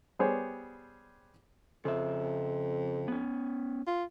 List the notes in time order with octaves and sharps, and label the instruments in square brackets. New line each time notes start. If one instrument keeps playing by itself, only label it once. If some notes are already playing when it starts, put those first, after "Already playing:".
[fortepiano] G3 B3 G#4 C5 C#5
[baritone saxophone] F2 [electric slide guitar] C#3 E5
[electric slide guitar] B3 C#4
[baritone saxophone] F4